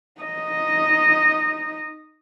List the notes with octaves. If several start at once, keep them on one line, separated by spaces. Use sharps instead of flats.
D#4 D#5